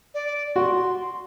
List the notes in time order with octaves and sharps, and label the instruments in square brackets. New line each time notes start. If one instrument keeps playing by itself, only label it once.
[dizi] D5
[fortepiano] F#4 [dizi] C6